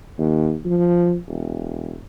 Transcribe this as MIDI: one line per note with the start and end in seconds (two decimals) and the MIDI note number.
0.18 0.55 39
0.65 1.17 53
1.28 1.97 28